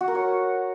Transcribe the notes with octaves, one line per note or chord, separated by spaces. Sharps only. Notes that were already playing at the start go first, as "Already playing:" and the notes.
F#4
A#4
C#5